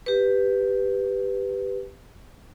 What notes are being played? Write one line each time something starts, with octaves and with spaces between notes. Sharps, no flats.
G4 B4